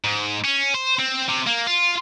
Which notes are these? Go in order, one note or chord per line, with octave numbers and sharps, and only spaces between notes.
G#2
C#4
C5
C4
C3
A#3
F4